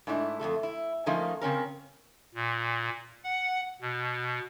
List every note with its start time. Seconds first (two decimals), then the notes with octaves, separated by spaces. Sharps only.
0.07 G#2 A3 D4 E4
0.40 F2 A#2 A3 A4
0.63 E4
1.06 F3 A3 A#3 C#4 D#4
1.41 C#3 C4 C#4 A#4
2.35 A#2
3.24 F#5
3.81 B2